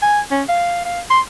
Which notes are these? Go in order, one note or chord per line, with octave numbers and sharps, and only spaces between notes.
G#5
C#4
F5
F5
C6